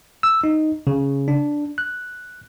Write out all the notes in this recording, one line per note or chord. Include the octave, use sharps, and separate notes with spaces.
E6
D#4
C#3
D4
F#6